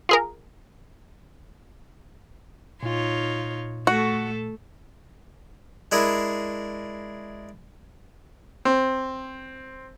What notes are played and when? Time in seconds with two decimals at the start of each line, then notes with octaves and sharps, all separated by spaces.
0.09 F4 G#4 A#4
2.83 A#2 D#4 F4 C#5
3.87 A3 F#4 A4
5.92 G#3 D4 E4 G#4 A#4
8.65 C4